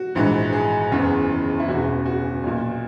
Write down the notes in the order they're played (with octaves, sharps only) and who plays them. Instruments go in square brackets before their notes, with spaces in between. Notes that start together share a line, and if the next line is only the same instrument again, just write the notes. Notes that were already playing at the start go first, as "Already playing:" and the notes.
Already playing: [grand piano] F#4
A#1 G#2 E3
G#4
F#1 E2 C#3 E3
E4
E1 E2 C#3 F#4
F#4
B1 A#2